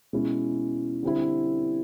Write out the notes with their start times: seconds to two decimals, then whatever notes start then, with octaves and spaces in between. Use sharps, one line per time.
0.13 B2 G#3 C#4 E4
1.03 D3 G3 C4 E4